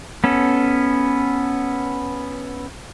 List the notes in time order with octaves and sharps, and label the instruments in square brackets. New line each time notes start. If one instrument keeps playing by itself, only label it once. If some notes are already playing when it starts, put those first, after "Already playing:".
[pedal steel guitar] B3 C#4 A4